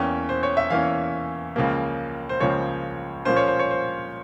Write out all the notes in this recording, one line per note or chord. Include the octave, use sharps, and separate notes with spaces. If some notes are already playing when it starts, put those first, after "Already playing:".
Already playing: E2 E3 A#3 C#4 G5
C5
C#5
E5
E2 E3 A#3 C#4 F5
C#2 C#3 F3 A#3
C5
C#2 C#3 F3 A#3 C#5
A#2 F3 A#3 C#4 C5
C#5
C5
C#5
C5